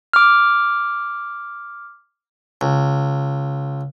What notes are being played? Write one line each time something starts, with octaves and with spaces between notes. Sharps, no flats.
D6 F6
C#2